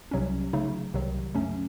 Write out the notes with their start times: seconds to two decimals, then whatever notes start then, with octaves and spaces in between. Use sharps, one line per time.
0.11 C2 C3 F#3 C#4
0.53 C#3 F#3 A3 D#4
0.94 C2 C3 D#3 F#3
1.34 F#2 C#3 F#3 A3 C#4